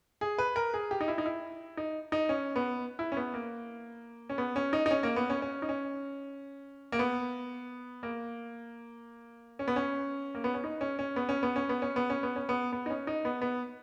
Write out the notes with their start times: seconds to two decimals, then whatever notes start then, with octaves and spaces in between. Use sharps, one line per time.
0.21 G#4
0.38 B4
0.56 A#4
0.74 G#4
0.91 G4
1.01 D#4
1.08 E4
1.18 D#4
1.26 E4
1.77 D#4
2.12 D#4
2.29 C#4
2.56 B3
2.99 E4
3.12 C#4
3.17 B3
3.34 A#3
4.30 C#4
4.38 B3
4.56 C#4
4.73 D#4
4.86 D#4
4.91 C#4
5.03 A#3
5.16 B3
5.30 C#4
5.42 C#4
5.62 D#4
5.69 C#4
6.92 A#3
6.99 B3
8.03 A#3
9.59 C#4
9.68 B3
9.76 C#4
10.35 A#3
10.44 B3
10.54 C#4
10.64 D#4
10.81 C#4
10.99 C#4
11.16 B3
11.29 C#4
11.43 B3
11.56 C#4
11.69 B3
11.82 C#4
11.96 B3
12.10 C#4
12.23 B3
12.36 C#4
12.49 B3
12.72 B3
12.86 D#4
12.90 C#4
13.07 D#4
13.25 B3
13.42 B3